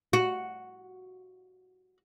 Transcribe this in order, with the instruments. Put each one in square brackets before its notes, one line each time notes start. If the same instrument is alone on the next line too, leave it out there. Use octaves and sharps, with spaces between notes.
[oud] F#4